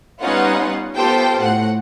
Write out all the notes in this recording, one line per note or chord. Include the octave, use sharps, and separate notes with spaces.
G3 B3 C#4 D#4 F4 F#5
B3 F4 G4 A4 C5 G5
A2 F#5